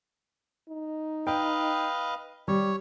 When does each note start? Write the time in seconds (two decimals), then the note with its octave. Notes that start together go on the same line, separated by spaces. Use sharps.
0.70 D#4
1.27 B4 D#5 F5 G5
2.48 G3 C#5